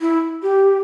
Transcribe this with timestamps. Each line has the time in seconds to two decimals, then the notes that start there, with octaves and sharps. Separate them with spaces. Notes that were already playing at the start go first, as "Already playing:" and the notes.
0.01 E4
0.43 G4